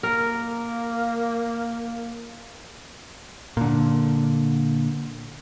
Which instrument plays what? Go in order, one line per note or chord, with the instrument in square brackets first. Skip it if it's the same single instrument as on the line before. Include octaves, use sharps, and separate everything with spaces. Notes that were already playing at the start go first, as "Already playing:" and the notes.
[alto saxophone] A#3 [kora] A#4
[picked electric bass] A#2 D3